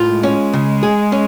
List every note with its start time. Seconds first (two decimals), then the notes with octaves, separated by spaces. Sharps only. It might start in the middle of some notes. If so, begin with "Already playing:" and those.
Already playing: A2 F4
0.09 G#3
0.23 C#4
0.53 C#3
0.83 G#4
1.12 C#4